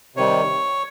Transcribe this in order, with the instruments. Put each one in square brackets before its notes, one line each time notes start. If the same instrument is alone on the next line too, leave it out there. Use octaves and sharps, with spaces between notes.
[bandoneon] C3 D#3 G3 C#5